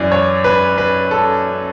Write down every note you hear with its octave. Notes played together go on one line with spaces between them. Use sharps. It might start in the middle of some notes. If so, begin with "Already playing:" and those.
Already playing: F#2 E3 D5
C#5
B4
B4
A4